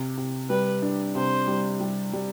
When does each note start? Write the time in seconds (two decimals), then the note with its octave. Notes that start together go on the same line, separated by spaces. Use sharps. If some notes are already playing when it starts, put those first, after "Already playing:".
Already playing: C3
0.17 C3
0.49 G3 B4
0.82 D4
1.15 C3 C5
1.48 G3
1.80 G3
2.13 G3